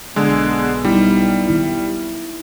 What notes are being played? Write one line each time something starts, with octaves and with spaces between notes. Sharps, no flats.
B1 D3 G#3 B3
G3 D#4 E4
D#3 E4